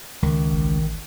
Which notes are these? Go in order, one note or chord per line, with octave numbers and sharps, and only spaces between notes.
C#2 D#3
A1